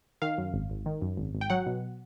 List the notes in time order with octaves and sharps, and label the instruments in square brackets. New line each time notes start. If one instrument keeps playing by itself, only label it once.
[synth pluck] D#3 F5
F#2
G#1
G#1
D#3
F#2
G#1
G#1
G5
F#3 F#5
B2